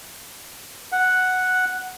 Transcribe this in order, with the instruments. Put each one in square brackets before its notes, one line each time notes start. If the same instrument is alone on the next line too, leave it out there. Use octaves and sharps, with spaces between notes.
[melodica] F#5